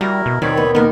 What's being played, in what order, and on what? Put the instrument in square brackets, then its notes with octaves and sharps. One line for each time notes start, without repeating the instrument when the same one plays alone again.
[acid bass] G3 [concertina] E4 A#4 [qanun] F#4 [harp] A#5
[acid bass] B2
[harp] D#2 B2 [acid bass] D#3 [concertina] C4 C#5 B5 [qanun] D5
[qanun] B3
[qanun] D#3 A#3 [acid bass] B3 [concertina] A#4